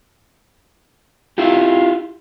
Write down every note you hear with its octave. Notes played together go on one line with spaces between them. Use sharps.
E4 F4 G4